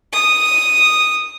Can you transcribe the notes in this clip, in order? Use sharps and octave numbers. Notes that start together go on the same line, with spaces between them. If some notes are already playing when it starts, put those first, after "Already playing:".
D#6